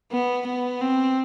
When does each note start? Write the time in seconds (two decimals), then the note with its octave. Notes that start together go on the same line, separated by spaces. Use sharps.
0.12 B3
0.46 B3
0.82 C4